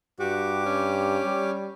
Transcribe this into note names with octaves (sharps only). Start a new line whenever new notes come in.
G2 F#4 G4 D6
C#4
G3